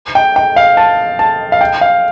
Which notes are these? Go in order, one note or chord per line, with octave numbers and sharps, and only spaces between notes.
G5
G5
F5
A5
A5
F5
G5
F5